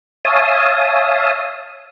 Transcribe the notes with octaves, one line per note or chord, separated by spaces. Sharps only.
C#5 E5 F5 G#5 A5 D#6